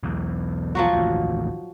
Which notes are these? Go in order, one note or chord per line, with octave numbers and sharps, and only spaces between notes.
B1 E2
F3 F#3 F#4
A1 D#2